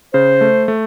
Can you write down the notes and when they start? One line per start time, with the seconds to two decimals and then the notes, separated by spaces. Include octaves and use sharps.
0.14 C#3 C5
0.41 A3
0.68 A3